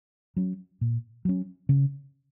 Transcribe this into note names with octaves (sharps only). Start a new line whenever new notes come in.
F#3 C#4
A#2
F#3 C#4
C#3